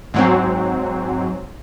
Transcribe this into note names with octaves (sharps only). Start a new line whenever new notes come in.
G#2 F#3 C4